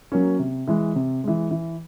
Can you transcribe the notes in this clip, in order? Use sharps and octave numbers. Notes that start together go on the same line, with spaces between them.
F#3 A#3 C#4
C3
E3 G#3
C3
E3 G#3
E3